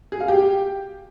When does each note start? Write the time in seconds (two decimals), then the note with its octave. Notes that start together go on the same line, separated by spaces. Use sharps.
0.12 G#4
0.20 F5
0.28 G4